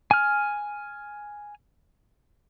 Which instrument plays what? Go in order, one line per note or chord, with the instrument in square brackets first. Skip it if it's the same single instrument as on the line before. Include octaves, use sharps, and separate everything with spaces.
[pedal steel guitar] G#5 F6